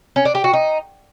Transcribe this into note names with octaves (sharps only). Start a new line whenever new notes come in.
C#4
D4
G4
F#4
D#4